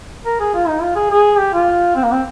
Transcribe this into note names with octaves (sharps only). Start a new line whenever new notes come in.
A#4
G#4
F4
D#4
F4
G#4
G#4
G4
F4
C4
A#3
C4